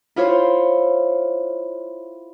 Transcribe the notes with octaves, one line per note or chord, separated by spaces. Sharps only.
E4 F4 C5 C#5